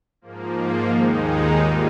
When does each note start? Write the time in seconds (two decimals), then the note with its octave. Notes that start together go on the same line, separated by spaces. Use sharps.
0.21 G#2 F3 A#3
0.88 D#2 D#3 G#3 D#4
1.55 G#2 G3 A#3 F4